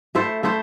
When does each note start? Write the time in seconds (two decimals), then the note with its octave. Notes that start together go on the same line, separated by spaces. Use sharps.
0.15 A3 E4 A4 C5
0.43 A3 E4 A4 C5